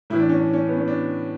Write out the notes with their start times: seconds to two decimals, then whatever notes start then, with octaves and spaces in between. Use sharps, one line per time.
0.10 A2 E3 E4
0.20 D4
0.29 C#4
0.39 D4
0.53 C#4
0.68 B3
0.78 C#4
0.88 D4